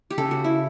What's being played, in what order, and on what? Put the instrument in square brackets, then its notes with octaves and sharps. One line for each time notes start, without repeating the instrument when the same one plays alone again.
[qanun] G4
[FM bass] C#3 [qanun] A4
[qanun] F#4
E4